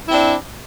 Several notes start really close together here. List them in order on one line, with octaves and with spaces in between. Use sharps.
E4 C4 D4